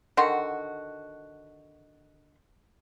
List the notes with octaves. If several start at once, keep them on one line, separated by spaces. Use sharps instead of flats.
D3 D#3 F#4 C6